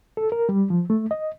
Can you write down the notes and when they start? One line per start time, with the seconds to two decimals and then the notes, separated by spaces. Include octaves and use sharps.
0.17 A4
0.32 A#4
0.49 G3
0.70 F3
0.90 A3
1.11 D#5